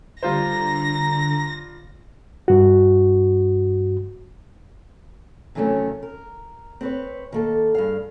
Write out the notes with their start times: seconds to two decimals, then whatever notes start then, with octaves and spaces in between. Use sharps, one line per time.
0.23 D3 G3 F4 C5 A#5 A#6
2.48 G2 F#4
5.55 C3 D#3 E3 F#3 A3 C#4
6.03 A#4
6.81 C4 B4 C#5
7.32 D#3 A#3 A4
7.75 G2 G#4 F5